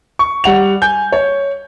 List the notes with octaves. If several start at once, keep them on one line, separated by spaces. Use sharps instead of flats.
C#6
G3 F#5 F7
G#5 G6
C#5